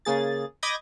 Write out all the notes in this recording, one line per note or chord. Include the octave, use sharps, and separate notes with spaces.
C#3 A#3 G#4 A6
D#5 B5 D6 G6 G#6 A#6